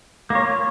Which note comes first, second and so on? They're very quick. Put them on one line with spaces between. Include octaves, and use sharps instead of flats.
A#3 C#5 F4